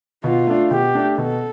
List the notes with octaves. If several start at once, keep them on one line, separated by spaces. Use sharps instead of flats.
B2 F4
A3 D4
B2 G4
A3 D4
B2 A4